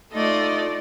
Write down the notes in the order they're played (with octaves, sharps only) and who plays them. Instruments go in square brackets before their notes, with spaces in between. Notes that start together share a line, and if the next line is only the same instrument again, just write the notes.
[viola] A3 D5 [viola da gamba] D#4 F4 D#5